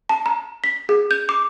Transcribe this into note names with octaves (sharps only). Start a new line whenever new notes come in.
A5
A#5
B6
G#4
G6
D6